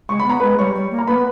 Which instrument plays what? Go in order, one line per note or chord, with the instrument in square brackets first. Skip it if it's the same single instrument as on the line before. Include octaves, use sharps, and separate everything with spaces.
[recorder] G#3 [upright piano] C#6
[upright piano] B5
[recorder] B3 [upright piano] A#5
[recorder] G#3 [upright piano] B4 B5
[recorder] G3 [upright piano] C#5 C#6
[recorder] G3
A#3
[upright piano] A#5
[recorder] A#3 [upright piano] B4 B5
[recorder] B3